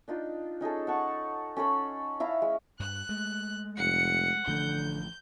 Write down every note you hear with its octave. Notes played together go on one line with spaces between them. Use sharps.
D4 D#4 F4
C#4 D#4 G#4 A4
F#5 A5 C#6
C#4 A4 B5 C6
E4 F5 A#5
G#3
G2 F#6
G#3 A3
F1 F#5 C#7
A1 D3 F3 A3 G6